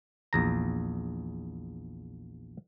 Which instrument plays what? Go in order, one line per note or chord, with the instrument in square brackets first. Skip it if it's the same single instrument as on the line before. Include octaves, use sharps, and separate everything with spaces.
[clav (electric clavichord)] A#1 E2 A#5